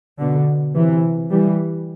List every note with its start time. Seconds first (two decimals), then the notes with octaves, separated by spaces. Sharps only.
0.19 B2 D3
0.75 C3 E3
1.31 E3 G3